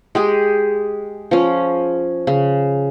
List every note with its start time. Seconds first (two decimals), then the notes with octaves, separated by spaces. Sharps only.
0.15 G#3 G4 G#4
1.31 F3 C#4
2.27 C#3